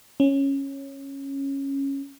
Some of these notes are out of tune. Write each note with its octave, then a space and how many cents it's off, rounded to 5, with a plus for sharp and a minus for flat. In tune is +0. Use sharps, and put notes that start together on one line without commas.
C#4 -10